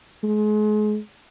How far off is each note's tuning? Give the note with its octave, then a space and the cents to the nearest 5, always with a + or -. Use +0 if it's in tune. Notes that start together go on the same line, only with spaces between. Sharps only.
G#3 +35